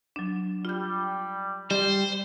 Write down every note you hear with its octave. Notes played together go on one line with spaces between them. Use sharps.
F#3 D4
G3 F4 G6
G3 C5